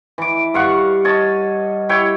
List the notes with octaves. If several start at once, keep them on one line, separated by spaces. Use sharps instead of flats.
E3 D6
G2 F5 F#5 C#6
C#5 D#5 A5
E4 G4 C#5 G5